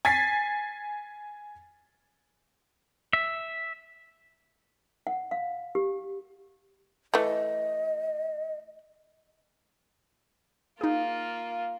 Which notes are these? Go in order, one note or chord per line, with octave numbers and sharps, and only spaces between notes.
G#5 G#6 A6 B6 C7
E5
F#5
F5
G4
E3 A3 D#5
A#3 D#4 F4 G#4